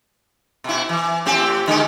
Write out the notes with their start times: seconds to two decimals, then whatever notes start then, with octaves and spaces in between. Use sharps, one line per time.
0.64 B2 E4
0.89 E3
1.26 A2 C4 G4
1.67 D3 G#3 G4